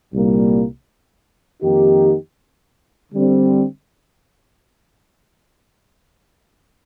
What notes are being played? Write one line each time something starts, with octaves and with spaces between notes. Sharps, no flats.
C2 A#2 G3 A#3
F2 D#3 A#3 D#4 G4
D3 G3 C4